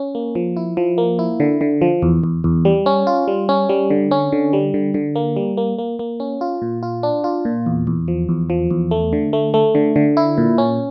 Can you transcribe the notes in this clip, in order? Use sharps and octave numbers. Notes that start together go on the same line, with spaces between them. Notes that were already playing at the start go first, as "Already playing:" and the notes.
Already playing: C#4
A#3
F3
E4
F3
A#3
E4
D3
D3
F3
E2
E2
E2
G3
C#4
F4
G3
C#4
G3
D3
C#4
D3
G3
D3
D3
A#3
G3
A#3
A#3
A#3
C#4
F4
A#2
F4
D4
F4
A#2
E2
E2
F3
E2
F3
E2
A3
D3
A3
A3
D3
D3
E4
A#2
C#4